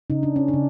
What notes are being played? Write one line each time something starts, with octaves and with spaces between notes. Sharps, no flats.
C#3 D#4
D4
C#4
D4
C#3